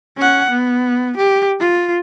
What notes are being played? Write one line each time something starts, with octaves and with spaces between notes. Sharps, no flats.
C#4 F#5
B3
G4
F4